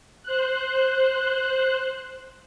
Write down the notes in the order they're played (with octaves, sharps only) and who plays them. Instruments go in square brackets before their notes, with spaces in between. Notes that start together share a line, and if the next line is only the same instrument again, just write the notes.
[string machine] C5 F#6